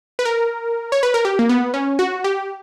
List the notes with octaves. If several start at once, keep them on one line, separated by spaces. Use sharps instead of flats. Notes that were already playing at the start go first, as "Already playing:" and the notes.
B4
A#4
C#5
B4
A#4
G4
A#3
B3
C#4
F#4
G4